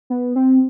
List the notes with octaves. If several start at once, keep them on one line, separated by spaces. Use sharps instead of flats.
B3
C4